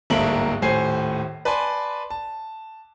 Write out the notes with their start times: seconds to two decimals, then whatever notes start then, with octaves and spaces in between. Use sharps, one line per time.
0.10 D1 G1 G#2 A#3 E5 F#7
0.62 D#1 A2 C5 G#5 C7
1.45 B4 D5 G#5 A5 C6
2.10 A5